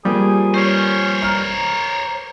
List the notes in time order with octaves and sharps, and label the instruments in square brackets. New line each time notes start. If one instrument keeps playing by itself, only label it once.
[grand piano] F3 A#3 [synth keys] G3 [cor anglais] G#4
[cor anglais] C#4 [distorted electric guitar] C5 C#5
[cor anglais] A#4 [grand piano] F6